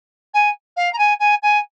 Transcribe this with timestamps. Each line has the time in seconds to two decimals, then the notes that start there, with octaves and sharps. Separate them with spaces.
0.34 G#5
0.76 F5
0.93 A#5
0.98 G#5
1.20 G#5
1.42 G#5